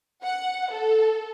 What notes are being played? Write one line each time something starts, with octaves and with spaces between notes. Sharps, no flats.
F#5
A4